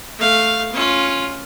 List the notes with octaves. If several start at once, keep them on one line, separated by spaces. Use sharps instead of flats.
A3 F5
C#4 F4